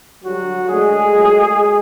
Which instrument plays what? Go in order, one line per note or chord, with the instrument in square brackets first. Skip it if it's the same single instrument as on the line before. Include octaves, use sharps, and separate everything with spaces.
[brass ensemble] D3 F#3 G3 F#4
D3 F#3 G#3 A3 G#4
A#2 F#3 A3